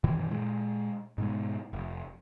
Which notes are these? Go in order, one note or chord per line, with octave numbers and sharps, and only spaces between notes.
F#2 B2 D#3 E3
A#2 G#3
G#2 B2 G#3
F1